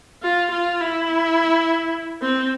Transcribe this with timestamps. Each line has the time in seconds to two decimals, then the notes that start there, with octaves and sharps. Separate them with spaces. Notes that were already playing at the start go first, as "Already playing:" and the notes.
0.23 F4
0.51 F4
0.80 E4
2.21 C4